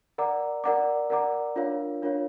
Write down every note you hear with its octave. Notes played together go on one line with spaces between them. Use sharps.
A#4 D5 F#5 A#5 D6
A#4 D5 F#5 A#5 D6
A#4 D5 F#5 A#5 D6
D4 F4 A#4 C#5 F5
D4 F4 A#4 C#5 F5